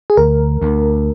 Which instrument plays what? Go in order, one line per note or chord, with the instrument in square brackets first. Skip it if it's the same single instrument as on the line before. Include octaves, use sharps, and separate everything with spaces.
[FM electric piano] G#4
[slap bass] D2 [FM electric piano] A#4
[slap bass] D2